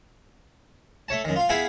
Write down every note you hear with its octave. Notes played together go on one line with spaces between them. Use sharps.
A3 C#5 A5
F#2 D#3
F4 F5
B3 E4 G#4 F5 G#5 B5